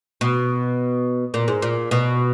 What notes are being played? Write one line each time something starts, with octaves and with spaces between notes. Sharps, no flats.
B2
A#2
G#2
A#2
B2